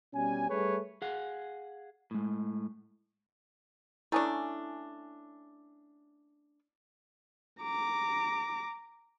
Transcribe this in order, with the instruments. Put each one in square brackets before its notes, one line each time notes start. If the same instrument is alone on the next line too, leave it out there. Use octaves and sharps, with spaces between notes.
[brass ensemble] B2 G3 C#4 G#5
G3 A3 G#4 B4 C#5
[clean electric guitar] G#4 F5 F#5
A2 G#3
[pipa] A3 C#4 D4 [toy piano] E4 G#5 D#6
[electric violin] A#5 D6